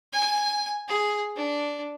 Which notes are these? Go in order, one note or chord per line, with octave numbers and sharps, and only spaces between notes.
G#5
G#4
D4